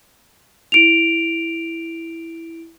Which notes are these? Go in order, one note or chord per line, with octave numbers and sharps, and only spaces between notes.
E4 D7 F7